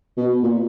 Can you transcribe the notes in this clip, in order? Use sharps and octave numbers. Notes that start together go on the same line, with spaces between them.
B2
A#2